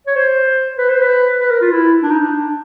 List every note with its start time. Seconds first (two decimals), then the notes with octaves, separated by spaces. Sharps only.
0.07 C#5
0.16 C5
0.78 B4
0.90 C5
1.01 B4
1.40 B4
1.51 A#4
1.61 F4
1.72 E4
2.03 D4
2.11 D#4
2.20 D4